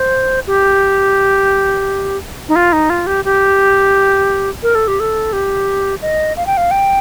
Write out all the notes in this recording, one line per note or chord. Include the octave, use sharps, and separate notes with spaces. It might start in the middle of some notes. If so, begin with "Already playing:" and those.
Already playing: C5
G4
D#4
F4
D#4
F4
G4
G4
A#4
A4
G4
A4
G4
D#5
F5
G5
F5
G5